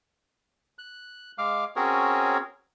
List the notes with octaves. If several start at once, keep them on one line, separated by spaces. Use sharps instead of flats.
F#6
G#3 F5 D6 F6
C4 C#4 F#4 G#4 A#4 C#5